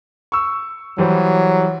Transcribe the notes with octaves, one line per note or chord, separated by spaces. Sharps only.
C#6 E6
E3 F#3 G3 C5